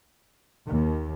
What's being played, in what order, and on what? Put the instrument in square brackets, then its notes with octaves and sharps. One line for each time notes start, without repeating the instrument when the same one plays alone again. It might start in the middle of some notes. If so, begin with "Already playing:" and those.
[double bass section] D#2